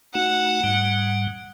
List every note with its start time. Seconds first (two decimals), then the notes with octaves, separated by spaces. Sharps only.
0.15 A3 D#4 F#4 F#5
0.64 G#2 G3